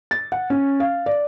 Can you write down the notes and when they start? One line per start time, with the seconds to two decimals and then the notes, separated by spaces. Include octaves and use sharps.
0.11 A6
0.32 F#5
0.50 C#4
0.80 F5
1.06 D5